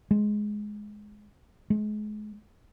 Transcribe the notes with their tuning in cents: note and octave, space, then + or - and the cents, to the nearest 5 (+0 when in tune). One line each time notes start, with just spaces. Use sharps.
G#3 +10
G#3 +35